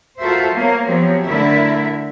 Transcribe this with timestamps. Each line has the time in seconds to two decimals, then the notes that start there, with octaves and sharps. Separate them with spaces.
0.19 F4 F#4 A4 A#4 C5 E5
0.55 A#3 B3 A#4 C#5 F5
0.86 F3 F#3 B3 C4 G4 C#5
1.25 D3 A3 E4 A#4 E5